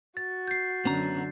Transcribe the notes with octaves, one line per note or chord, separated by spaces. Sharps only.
F#4 A6
G6 C7
F#2 D3 B3 C#4 A#5